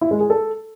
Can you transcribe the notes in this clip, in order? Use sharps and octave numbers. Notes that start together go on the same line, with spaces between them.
E4
G#3
G#4
A4